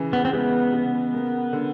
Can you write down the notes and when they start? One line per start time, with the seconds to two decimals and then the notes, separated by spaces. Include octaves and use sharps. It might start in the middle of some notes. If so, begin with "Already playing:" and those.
Already playing: C#3 E3
0.13 B3
0.25 C4
0.33 G#3 B3
0.73 C#3
1.13 A#3
1.53 D3